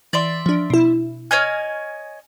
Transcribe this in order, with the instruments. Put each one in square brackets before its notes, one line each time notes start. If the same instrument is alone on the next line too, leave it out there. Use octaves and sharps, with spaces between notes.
[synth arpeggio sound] E3 [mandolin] D5 E5 C6
[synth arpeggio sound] F3 D4
B2 E4
[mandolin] C#5 D#5 G#5 [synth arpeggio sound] F6